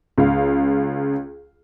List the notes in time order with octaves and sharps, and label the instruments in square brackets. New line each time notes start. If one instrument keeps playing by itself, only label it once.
[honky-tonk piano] C#2 F5